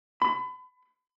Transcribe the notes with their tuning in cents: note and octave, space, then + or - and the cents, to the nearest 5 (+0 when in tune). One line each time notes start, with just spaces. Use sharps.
B5 +35